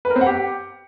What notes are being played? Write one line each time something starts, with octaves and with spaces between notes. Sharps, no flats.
B4
A#4
C4
F#5
G4